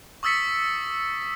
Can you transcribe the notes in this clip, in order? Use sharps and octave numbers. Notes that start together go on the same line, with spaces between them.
C#6 D#6 E6 A6 B6 C#7